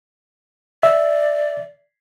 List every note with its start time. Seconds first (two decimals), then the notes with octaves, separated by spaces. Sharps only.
0.83 D5 E5